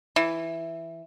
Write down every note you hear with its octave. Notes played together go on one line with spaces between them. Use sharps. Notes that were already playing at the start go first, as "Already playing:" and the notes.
E3